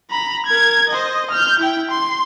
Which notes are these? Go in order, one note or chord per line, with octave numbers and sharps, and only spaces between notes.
A#5 B5
A#4 G#6
C5 D#5
F6 G6
E4 G5
C6